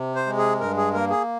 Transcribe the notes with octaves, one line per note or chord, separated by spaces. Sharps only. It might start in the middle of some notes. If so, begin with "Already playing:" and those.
Already playing: C3
C5
G#3
G#4
G2 A#4
G#4
A#3 A#4
G#4